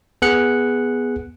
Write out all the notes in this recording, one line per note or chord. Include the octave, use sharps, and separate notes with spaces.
B3 G#4 F#6 C#7